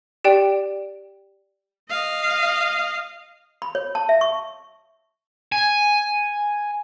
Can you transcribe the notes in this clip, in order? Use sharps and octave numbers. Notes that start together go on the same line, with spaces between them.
G4 D5 G5
D#5 F5
B5
C#5
A5
E5
C#6
G#5